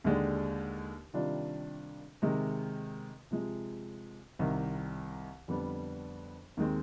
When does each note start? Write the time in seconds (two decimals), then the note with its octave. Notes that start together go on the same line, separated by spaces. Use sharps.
0.04 D#2 D3 G#3 D4 G4
1.14 C3 D#3 G3 D4 F4
2.22 C3 D#3 G#3
3.31 C3 F3 G#3
4.39 C2 C3 D#3
5.48 F2 D3 G3 B3 D4
6.57 D#2 D#3 G#3 C4